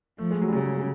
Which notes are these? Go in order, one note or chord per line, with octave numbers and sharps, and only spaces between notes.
F3 A3
G#3
F#3
G3
C#3 F#3